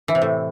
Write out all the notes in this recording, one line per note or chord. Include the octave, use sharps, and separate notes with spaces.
E3
C3
A2